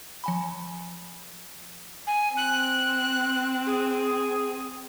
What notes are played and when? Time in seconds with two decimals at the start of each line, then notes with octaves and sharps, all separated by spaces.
0.24 F3 G#5 B5
2.07 G#5
2.37 C4 F#6
3.66 G#4